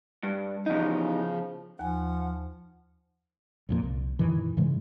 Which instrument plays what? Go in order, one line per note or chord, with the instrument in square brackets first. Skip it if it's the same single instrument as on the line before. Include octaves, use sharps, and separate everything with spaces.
[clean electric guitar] G2
[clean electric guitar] E2 D#4 [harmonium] C#3 F3
[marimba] D#2 G#5 [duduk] F3 [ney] F#5
[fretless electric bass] A#1 F2 A#2
C2
F#2 A#2 D#3 E3
G#2 C#3 E3 G#3